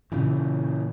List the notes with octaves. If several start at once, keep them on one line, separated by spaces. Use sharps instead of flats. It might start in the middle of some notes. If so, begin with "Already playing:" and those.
A#2 C#3 E3